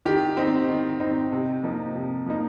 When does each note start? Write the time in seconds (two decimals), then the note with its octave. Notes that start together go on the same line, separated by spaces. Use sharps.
0.05 D#3 G4
0.37 C4 D#4
0.69 D#3
1.00 C4 D#4
1.32 C3
1.63 F3 A#3 D#4
1.96 C3
2.26 F3 A#3 D#4